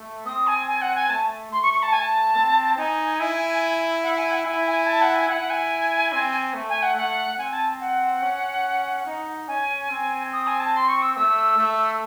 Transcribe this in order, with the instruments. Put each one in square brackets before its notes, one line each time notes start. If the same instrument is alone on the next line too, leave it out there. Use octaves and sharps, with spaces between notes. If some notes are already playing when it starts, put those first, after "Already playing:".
Already playing: [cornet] A3
[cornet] C4 [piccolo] D#6
[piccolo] G#5
G#5
F#5
G#5
[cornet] A3 [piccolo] A5
[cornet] A3 [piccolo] C6
[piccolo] C#6
C#6
A5
G#5
A5
[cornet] C4
[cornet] D#4 [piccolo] G#5
[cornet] E4
[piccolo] F#5
G#5
F#5
[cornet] E4 [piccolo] G#5
[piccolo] G#5
A5
F#5
G#5
[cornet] E4 [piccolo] F#5
[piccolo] G#5
[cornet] C4
A3
[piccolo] G#5
F#5
[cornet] A3 [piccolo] F#5
[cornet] C4 [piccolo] G#5
[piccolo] A5
F#5
[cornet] C#4
D#4
[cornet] C#4 [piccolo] G#5
[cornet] C4
[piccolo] D#6
G#5
A5
C6
C#6
E6
[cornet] A3 [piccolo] E6
[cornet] A3